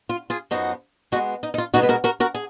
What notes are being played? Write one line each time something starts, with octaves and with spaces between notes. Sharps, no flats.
F4
F4 G#4
F#2 F3 B3 D#4 F#4
B2 G#3 B3 D#4 F#4
D#4
D#4
F4
B2 G#3 B3 D#4 F#4
B4
F#4 A#4
F#4 A#4
F#4 A#4
G#4